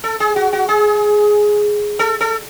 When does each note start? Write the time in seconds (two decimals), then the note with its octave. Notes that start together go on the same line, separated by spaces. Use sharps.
0.04 A4
0.20 G#4
0.36 F#4
0.53 F#4
0.69 G#4
1.99 A4
2.21 A4